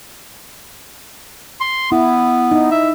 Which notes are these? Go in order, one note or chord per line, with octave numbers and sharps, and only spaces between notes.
C6
B3 E4
D#4
E5